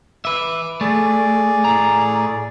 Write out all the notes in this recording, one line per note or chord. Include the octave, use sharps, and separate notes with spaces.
B4 E5 D6
A3 G#4 D5
A2 A#5